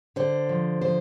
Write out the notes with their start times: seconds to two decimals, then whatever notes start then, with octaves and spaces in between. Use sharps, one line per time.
0.16 D3 C5
0.49 F3
0.81 F3 C5